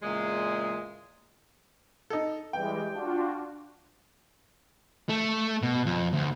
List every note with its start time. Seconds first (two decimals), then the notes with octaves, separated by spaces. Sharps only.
0.02 E2 A#2 C#3 G#3
2.10 D#4 A4
2.53 E3 G3 G#3 G5
2.93 D4 F4 F#4
5.09 A3
5.62 B2
5.86 F2
6.13 D2